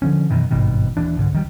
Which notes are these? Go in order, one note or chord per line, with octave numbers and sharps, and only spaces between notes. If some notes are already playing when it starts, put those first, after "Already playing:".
D3 F3 C#4
F#2 B2 D#3 E3
G#1 G2 B2 D#3
D#1 D#2 E3 D4
C2 G#2 D3
C#2 D#3 G3